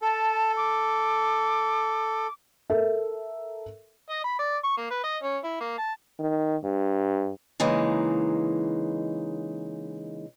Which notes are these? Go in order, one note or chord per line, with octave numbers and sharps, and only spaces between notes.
A4 A5
D6
A4 A#4 E5
D#5
B5
D5
C#6
A#3
B4
D#5
C#4
E4
A#3
A5
D#3
G2
C#3 E3 G#3 A#3 D#4